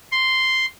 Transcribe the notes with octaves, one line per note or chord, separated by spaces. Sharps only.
C6